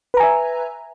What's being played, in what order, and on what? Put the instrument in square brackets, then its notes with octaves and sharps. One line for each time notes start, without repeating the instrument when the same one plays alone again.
[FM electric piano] B4
A#5
G#5
E5